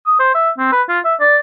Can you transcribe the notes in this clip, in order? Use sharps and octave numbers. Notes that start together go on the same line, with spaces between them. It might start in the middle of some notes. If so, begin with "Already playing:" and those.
D#6
C5
E5
C4
B4
F4
E5
D5